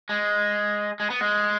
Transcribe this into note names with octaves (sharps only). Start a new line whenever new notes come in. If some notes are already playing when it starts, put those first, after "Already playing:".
G#3
G#3
B3
G#3